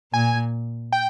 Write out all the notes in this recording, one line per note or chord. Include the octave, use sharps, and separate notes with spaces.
A#2 G#5
G5